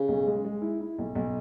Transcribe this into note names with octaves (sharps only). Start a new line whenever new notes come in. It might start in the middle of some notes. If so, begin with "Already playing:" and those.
Already playing: C#3
B1
G#3
G#3
E4
E4
B1
B1